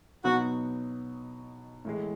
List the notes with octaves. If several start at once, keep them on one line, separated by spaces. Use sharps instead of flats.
B2 F#3 B3 D#4 F#4
A2 E3 G#3